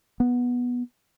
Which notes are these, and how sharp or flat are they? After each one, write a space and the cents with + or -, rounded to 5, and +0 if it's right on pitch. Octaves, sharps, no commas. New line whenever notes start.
B3 -10